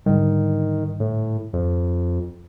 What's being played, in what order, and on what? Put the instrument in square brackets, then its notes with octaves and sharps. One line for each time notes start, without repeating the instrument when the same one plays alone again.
[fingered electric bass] G#2 D3 G3 [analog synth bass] D#3
[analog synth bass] A2
F2